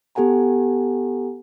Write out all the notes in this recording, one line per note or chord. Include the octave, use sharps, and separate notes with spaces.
B3 G4 A4 F#5 G#5 A#5